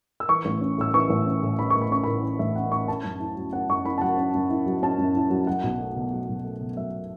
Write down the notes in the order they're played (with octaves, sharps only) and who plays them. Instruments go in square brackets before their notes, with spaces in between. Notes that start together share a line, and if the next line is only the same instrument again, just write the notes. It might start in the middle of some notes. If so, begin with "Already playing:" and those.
[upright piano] E6
E3 C#6
A1
C#4
A2 E6
E3 C#6
A1
C#4
A2
E3 B5
A1 C#6
B5
C#4 C#6
A2 B5
E3
A1 E5
C#4 F#5
A2 C#6
C#4 A5
F#2
E4
F#3
C#4 F#5
F#2 C#6
E4 B5
A5
F#3 F#5
C#4
F#2
E4
F#3
C#4 A5
F#2
E4
F#3
F#3 F#5
B1
A3
B2
F#3
B1
A3
B2
F#3 E5